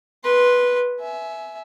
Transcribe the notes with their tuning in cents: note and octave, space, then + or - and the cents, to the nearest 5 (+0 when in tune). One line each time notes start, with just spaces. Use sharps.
B4 -10 C6 +0
E5 +0 G#5 +25